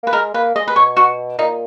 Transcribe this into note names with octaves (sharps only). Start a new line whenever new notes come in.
A#3 B4
G#3 A#4
A#3 B4
G#3 D#5
B4
B2 C#5
F#4
A#2 D#4